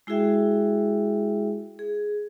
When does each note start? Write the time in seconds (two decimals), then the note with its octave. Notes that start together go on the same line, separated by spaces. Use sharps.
0.07 G#3 E4 F#4 G#4 E5 G5
1.79 G#4